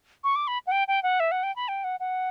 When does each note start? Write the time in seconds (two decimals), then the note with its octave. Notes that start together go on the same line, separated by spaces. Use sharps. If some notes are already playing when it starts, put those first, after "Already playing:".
0.24 C#6
0.36 D6
0.47 B5
0.67 F#5
0.72 G5
0.88 G5
1.03 F#5
1.20 E5
1.31 F#5
1.43 G5
1.56 B5
1.68 G5
1.84 F#5
2.00 F#5